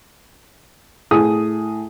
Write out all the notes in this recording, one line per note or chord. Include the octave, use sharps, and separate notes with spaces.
A2 G#4 D#6